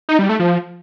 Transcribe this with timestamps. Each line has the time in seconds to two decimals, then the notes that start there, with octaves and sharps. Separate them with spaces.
0.09 D#4
0.19 G3
0.29 A3
0.39 F3